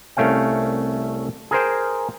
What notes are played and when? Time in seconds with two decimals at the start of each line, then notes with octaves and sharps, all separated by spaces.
0.17 C2 A3 C#4 F5 G5
1.51 G#4 A#4 C5 G5